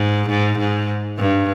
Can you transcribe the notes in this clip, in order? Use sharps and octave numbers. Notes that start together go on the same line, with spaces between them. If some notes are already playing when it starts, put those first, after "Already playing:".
Already playing: G#2
G#2
G#2
G2